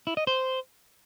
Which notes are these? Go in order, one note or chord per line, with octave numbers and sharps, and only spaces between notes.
E4
D#5
C5